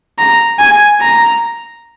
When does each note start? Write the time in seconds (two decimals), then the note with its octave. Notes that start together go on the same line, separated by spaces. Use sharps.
0.18 A#5
0.59 G#5
1.01 A#5